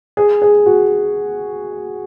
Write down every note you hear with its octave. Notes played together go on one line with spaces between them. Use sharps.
G#4
G#4
F#4